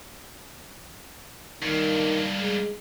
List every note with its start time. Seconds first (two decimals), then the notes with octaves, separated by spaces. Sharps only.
1.63 G2 D#3 A#3
2.40 G#3